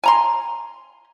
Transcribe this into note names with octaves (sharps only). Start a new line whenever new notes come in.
G#5 A#5 C6